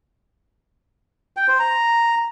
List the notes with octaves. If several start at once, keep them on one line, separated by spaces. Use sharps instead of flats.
G5
C5
A#5